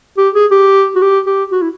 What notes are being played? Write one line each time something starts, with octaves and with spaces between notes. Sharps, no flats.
G4
G#4
G4
F#4
G4
G4
F#4
E4